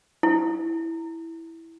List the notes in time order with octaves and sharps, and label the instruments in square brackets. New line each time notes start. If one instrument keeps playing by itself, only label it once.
[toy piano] E4